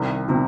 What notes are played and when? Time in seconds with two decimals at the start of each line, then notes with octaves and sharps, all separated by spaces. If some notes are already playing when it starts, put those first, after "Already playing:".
Already playing: C2 C3 D#3
0.29 C3 D#3